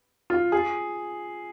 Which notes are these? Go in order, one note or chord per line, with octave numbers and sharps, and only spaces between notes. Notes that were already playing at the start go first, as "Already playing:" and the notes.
F4
G#4